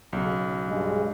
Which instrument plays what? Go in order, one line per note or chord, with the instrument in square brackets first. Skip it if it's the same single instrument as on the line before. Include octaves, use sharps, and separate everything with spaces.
[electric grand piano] B1 C#3
[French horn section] G2 G#3